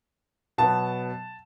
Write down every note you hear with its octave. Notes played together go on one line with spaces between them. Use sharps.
B2 F#3 B3 A5